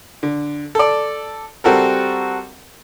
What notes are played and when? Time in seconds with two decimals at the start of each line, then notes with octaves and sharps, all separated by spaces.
0.23 D3
0.75 A4 D5
1.64 G3 C4 F#4 A4 A#4